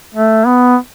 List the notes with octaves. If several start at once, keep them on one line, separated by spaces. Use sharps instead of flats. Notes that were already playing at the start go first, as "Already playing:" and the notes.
A3
B3